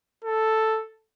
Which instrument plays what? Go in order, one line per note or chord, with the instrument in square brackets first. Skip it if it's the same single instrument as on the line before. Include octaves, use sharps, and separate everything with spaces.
[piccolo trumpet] A4